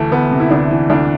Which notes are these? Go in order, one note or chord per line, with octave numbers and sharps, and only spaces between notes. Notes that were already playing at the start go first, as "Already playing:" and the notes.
Already playing: D2 E3 A3
D2 B3
C3
E4
D2 D4
E3
D2 D4